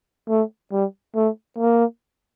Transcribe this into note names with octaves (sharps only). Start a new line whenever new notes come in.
A3
G3
A3
A#3